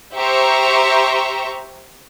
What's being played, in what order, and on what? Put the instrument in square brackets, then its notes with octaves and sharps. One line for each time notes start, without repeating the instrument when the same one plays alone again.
[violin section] G4 C5 E5 A#5 C#6